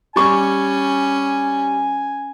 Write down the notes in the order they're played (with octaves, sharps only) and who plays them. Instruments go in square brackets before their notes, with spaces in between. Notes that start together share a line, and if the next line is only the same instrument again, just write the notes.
[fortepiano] G3 C#6 [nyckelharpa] C#4 [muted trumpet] G#5